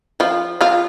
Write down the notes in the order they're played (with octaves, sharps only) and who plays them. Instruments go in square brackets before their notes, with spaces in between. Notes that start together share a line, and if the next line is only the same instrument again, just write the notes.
[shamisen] F3 F4
F3 F4